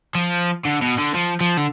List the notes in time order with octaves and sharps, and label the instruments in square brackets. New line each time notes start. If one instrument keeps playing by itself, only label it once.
[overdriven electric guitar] F3
D3
B2
D3
F3
F3
D3